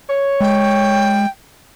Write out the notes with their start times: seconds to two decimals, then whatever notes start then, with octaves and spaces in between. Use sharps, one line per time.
0.09 C#5
0.41 G#3 G5